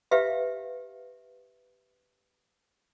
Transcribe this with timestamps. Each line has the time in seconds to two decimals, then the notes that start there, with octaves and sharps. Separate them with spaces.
0.11 G4 B4 E5 F5